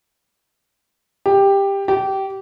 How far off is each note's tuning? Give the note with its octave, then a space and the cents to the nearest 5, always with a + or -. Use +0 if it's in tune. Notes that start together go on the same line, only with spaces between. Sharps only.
G4 +10
G4 -20